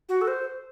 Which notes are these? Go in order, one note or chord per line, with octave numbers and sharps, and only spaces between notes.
F#4
A4
C5